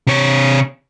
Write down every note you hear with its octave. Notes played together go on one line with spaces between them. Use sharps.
C3 C#5